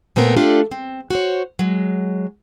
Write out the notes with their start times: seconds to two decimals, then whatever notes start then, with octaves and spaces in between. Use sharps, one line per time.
0.16 A#2 A3 B3 C4 A#4
0.36 A3 D4 F4 G4 A4 D5
0.71 C4
1.10 F#4 C5 C#5
1.59 F#3 G#3